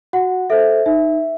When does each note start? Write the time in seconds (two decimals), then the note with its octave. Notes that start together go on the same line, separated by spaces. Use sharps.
0.13 F#4 F#5
0.50 A4 C5 E5
0.86 D#4 E5